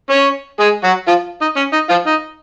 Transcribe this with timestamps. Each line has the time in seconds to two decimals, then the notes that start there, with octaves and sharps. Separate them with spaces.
0.10 C#4 C#5
0.60 G#3 G#4
0.84 F#3 F#4
1.08 F3 F4
1.41 D#4
1.57 C#4
1.73 D#4
1.89 F3 F4
2.07 D#4